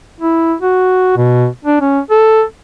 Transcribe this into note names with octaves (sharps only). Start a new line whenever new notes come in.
E4
F#4
B2
D4
C#4
A4